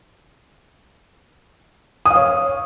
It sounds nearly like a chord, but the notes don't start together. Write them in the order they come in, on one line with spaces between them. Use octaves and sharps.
D#6 F5 C#5